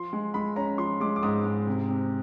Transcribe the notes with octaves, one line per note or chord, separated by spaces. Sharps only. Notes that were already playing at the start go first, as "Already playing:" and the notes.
Already playing: F3 C6
G#3
G#3 B5
C#4 A#5
F3 C6
G#3 D6
D6
G#2 D#6
G#2
C3
C3